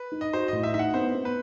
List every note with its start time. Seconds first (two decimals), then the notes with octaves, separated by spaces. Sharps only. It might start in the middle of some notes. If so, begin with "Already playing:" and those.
Already playing: B4
0.12 D#4
0.21 D#5
0.33 F#4 C5
0.48 A2 D#5
0.63 E5
0.74 D#4 E5
0.79 F#5
0.94 B3 C5
1.15 B3
1.25 B4